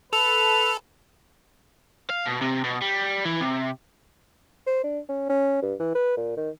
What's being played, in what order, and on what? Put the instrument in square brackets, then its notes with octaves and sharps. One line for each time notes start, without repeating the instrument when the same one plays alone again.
[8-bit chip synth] A4 [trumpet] B4 [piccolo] F7
[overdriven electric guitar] F5
B2
C3
B2
G3
E3
C3
[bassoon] C5
D4
C#4
C#4
G2
E3
B4
A#2
D#3